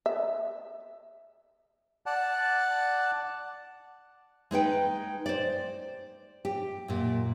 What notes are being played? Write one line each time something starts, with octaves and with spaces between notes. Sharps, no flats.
E5
D5 F#5 A5
G#3 D#4 B4 G5
C5 D5
G4
F#2 A#2